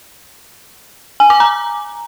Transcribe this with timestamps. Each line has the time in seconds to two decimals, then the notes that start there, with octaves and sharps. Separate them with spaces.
1.20 G#5
1.30 D6
1.40 A#5